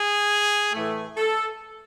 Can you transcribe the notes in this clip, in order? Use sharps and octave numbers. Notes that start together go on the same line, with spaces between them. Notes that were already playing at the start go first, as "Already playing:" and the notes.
Already playing: G#4
A2 E3 A3
A4